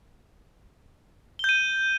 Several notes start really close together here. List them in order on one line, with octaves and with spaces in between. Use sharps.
G7 G6 D#7